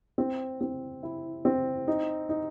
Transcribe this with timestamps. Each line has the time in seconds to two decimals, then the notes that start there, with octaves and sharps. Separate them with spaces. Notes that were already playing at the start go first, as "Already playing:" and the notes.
0.18 C4
0.61 C4
1.03 E4
1.45 C4
1.88 D#4
2.29 D#4